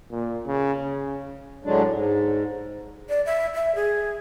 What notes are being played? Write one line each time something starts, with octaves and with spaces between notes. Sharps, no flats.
A#2
C#3
C#3
A2 D3 F#3 G#3 D4
G#2
D5
E5
E5
G#4